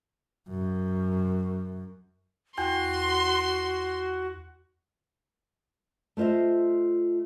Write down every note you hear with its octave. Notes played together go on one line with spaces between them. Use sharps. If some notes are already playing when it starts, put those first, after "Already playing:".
F#2
E2 F#4 G5 C6
A3 F4 C5 D#5 E5